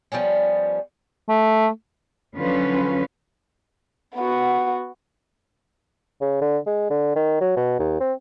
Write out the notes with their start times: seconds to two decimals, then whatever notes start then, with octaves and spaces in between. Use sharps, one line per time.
0.12 F3 G3 B3 C#4
1.29 A3
2.36 D3 F3 F#3 C#4 F4 B4
4.15 B3 F#4
6.21 C#3
6.41 D3
6.66 G#3
6.90 D3
7.16 D#3
7.41 F#3
7.56 B2
7.79 D#2
8.00 C4